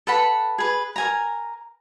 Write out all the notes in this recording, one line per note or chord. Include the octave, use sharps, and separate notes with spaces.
A4 B4 F#5 B5
G#4 B4
A#4 G#5 A#5